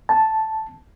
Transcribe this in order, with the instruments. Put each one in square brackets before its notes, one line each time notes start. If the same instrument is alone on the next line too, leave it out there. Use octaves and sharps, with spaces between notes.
[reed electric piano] A5